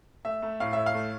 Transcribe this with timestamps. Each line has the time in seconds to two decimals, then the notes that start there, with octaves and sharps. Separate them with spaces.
0.25 A3 E5
0.42 A3
0.60 A2 F5
0.73 A2 E5
0.86 F5
0.94 A3